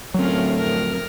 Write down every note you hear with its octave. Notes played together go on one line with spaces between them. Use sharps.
D2 A2 F#3 A3 C4 C#4 F4 A#4
F2 A#4